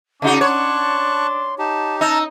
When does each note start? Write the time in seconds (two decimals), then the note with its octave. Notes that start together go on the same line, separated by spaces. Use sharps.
0.22 C#3 D4 D#4 F#4
0.41 C#5 A5 C6 C#6 F#6
1.58 D#4 G4 A5
2.01 D#4 A5 A#5 E6 F6